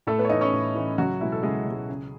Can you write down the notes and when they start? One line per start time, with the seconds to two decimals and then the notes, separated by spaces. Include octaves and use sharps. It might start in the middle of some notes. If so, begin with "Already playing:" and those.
0.07 A2 A3 A4
0.18 B3 B4
0.25 C#5
0.29 E3 A3 D#4 D#5
0.41 C#4 C#5
0.53 A2
0.76 E3 A3
0.98 C#2 F#3 F#4
1.21 B2 G#3 E4
1.32 A4
1.43 C#2 G#3 G#4
1.66 B2 G#3
1.89 C#2